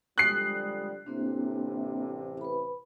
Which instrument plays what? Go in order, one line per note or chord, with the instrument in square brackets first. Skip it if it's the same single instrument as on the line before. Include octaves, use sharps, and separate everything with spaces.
[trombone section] F2 D3 G3 [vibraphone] G#3 D#6 [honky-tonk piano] F#6 C7
[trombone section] A1 C3 [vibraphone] A#3 C4 D4
[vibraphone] B4 B5